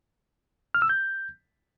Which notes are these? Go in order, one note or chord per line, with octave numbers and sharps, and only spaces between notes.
F6
E6
G6